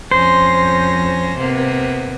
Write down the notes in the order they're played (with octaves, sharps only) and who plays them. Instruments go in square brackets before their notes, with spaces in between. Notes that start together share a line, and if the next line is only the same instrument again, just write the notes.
[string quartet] F2 C#4 A#6 [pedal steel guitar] C5
[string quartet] C3 A#3 B3